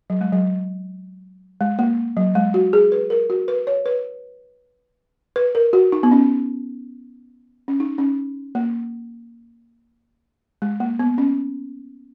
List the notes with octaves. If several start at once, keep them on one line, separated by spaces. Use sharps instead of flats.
F#3
G#3
F#3
G#3
A#3
F#3
G#3
F#4
G#4
B4
A#4
F#4
B4
C#5
B4
B4
A#4
F#4
D#4
B3
C#4
C#4
D#4
C#4
A#3
G#3
A#3
B3
C#4